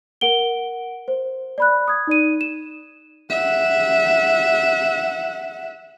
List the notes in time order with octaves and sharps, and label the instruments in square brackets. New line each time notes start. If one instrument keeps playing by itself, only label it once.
[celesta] A#4 F#5 D7 G7
C5
D5 B5 F#6
D#6 G#6
D#4 D5 D#7
E7
[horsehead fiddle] E5 F#5